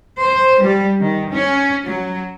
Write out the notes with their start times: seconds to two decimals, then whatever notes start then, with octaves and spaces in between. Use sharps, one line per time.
0.21 C5
0.61 G3
1.01 D#3
1.33 C#4
1.85 F#3